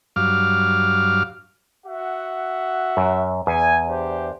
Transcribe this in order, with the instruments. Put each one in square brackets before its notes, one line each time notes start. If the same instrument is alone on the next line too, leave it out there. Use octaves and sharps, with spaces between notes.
[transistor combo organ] G2 F#3 F5 D6 F6
[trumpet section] F#4 E5 F#5
[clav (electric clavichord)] F#2
[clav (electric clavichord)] E2 [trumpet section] G#5
[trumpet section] D4 G4 C5